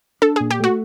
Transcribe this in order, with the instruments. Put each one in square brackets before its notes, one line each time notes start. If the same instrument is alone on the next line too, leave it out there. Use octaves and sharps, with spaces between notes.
[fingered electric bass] D4 [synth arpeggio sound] A4
[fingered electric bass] A#2 [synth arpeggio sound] G#4
[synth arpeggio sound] G4
[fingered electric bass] A3 [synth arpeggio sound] F#4